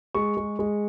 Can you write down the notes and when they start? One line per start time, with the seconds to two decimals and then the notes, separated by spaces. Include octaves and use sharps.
0.15 G#3 C#6
0.37 G#3
0.59 G#3